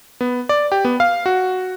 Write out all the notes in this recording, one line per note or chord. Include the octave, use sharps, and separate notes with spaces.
B3
D5
G4
B3
F5
F#4